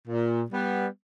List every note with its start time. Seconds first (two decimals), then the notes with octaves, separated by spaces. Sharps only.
0.08 A#2
0.51 G3 B3